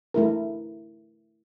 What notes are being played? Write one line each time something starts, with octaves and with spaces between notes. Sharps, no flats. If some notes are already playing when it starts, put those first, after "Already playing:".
A3 E4 A#4